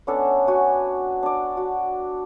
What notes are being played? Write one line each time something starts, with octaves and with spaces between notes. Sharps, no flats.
B3 C#4 D4 A4
F#4 G#5
D4 D5
F#4